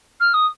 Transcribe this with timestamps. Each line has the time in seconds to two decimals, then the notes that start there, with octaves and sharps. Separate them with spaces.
0.20 F6
0.33 D#6